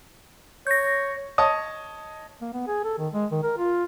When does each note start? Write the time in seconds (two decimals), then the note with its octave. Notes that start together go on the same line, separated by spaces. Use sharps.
0.67 C#5 G6 A#6
1.38 C#5 D#5 A5 D#6
2.41 A#3
2.53 B3
2.67 G#4
2.84 A4
2.98 D#3
3.13 G#3
3.32 D#3
3.43 A#4
3.58 F4